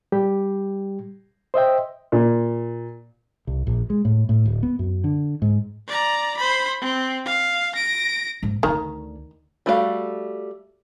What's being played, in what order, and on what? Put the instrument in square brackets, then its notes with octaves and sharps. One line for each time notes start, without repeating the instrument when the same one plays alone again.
[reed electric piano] G3 G4
C5 D#5 E5 G5
[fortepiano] A#2
[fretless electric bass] C2
A#1
G#3
A2
A2
D1
B3
F#2
D3
G#2
[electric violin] D5 A#5
C5 B5
C4
F5
A#6 D7
[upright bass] G#2
[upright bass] D2 D3 [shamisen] D#3
[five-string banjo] G3 A3 F#4 B4 F5